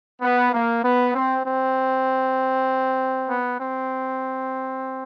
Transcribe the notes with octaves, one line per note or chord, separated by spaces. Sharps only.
B3
A#3
B3
C4
C4
B3
C4